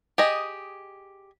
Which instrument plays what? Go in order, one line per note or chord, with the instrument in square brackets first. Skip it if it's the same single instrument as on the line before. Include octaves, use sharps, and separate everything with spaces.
[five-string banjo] G4 G#4 D#5